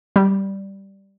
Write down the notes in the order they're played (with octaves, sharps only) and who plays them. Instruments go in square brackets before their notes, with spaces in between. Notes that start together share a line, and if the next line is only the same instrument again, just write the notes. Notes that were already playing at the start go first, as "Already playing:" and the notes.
[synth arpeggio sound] G3